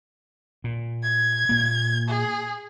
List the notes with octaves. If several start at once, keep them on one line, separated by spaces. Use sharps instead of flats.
A#2
G#6
A#2 A#3
G#4